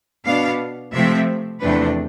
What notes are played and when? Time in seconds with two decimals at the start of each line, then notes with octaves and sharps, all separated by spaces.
0.25 B2 B3 D4 F5
0.93 C3 F3 A3 C4 E5
1.60 E2 C3 F3 A3 D4 B4